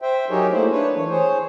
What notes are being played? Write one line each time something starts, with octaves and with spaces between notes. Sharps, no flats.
C5 E5 G5
F#3 D#4 G4 G#4 A#4 C#5
A3 A#3 E4 C5
D4 B4 C#5
E3 C#5
G#4 C5 C#5